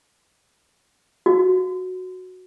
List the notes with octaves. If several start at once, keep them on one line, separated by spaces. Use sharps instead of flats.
F#4